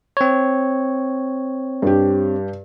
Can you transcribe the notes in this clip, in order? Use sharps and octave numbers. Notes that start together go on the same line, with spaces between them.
C4 C#5
G2 G4